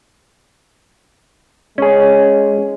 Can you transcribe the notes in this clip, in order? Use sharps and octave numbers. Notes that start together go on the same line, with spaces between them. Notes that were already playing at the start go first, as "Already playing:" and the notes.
G#3 C#4 G#4